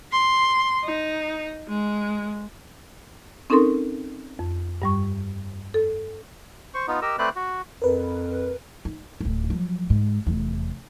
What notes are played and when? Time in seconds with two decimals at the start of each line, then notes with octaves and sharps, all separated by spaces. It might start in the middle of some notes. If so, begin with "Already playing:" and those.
0.12 C6
0.84 D#4
1.68 G#3
3.50 C4 C#4 D#4 A4 A#4 C6
4.39 F2
4.82 G2 G3 C#6
5.74 A4
6.74 C5 C#6
6.88 B3 D#4 F4
7.02 G4 A#4 D#5 E6
7.19 A3 C4 B4 C5 D5 F#6
7.36 F#4
7.82 F2 A#4 B4
8.85 D#4
9.21 D1 C#2
9.50 F3 F#3
9.90 G#2
10.27 F1 E2